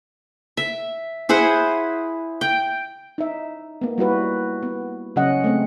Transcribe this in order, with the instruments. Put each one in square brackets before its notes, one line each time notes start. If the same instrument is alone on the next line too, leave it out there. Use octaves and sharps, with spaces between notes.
[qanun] E5
E4 G#4 C5 F#5
G5
[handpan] D#4 E5
A#3 B3
G3 E4 F#4 B4
B3
C#3 F#3 C#4 D#5 F#5
A3 C4